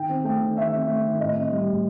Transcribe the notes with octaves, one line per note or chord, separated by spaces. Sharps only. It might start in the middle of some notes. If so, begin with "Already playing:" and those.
Already playing: D#3 G5
C4
A3 G5
D#3
D#3 E5
C4
A3
D#3
A2 D#5
C4
G3
A2